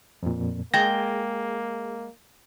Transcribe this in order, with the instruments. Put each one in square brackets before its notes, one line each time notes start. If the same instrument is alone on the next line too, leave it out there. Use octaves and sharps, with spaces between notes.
[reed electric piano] F2 A#2
[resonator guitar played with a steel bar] G#3 G5 [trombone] A#3 [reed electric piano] G#4 [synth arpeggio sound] A#6